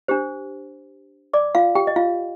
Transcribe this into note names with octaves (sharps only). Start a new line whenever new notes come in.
D4 G4 C5
D5 D6
F4 F5
G4 G5
D#5
F4 F5